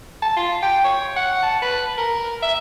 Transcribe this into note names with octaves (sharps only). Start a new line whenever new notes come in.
A5
F4
G5
C#5
F#5
A5
B4
A#4
E5